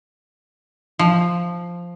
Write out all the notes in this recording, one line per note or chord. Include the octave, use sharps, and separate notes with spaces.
F3